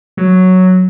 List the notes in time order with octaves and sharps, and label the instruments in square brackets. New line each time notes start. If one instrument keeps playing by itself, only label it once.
[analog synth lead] F#3